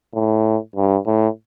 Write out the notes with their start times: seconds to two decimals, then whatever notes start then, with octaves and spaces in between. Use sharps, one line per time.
0.14 A2
0.76 G2
1.07 A2